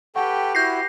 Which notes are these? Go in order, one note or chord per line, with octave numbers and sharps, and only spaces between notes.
G4 A4 B4 F#5 G5 C#6
E4 F#4 G6 A#6 C7